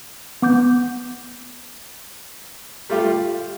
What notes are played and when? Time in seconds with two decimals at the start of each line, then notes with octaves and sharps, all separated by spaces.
0.42 B3 D6 G6
2.90 G3 A3 F4 G4 F5